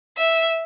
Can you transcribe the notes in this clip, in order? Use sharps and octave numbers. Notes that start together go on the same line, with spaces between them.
E5